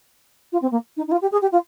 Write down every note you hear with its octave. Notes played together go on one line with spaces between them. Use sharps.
F4
C4
A#3
D#4
D#4
F4
G4
G#4
G4
F4